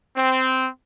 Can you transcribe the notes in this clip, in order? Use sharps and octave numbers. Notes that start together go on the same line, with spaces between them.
C4